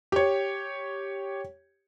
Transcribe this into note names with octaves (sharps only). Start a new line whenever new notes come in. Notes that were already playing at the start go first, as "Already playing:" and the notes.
G4 C#5